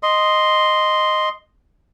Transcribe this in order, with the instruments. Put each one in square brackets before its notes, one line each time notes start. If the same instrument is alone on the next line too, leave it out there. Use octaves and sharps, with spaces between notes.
[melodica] D#5 C6